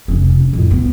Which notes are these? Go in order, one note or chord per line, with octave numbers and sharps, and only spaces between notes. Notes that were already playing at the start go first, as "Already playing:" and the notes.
F1 C#4
F2 A2
B3